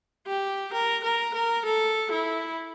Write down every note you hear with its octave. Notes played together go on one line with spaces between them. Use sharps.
G4
A#4
A#4
A#4
A4
E4